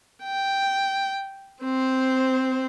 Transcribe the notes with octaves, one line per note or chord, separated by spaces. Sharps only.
G5
C4 C5